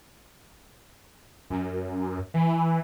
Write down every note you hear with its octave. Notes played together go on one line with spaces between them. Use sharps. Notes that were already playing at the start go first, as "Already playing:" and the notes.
F#2
E3